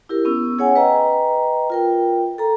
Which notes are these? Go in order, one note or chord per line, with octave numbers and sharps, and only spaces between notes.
E4 G4 A#4
B3 C#4 E6
G#4 C#5 F#5 G#5
B4 D#5 G5 A#5
F4 A#4 G5
A4 A#5